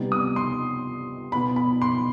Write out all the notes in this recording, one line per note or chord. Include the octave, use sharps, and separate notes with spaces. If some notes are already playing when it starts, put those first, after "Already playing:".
Already playing: C3 G3 B3 D#4
D#6
C6
B2 B3 D#4 B5
B5
C6